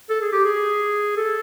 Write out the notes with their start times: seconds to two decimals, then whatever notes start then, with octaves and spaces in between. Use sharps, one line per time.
0.09 A4
0.21 G#4
0.33 G4
0.45 G#4
1.17 A4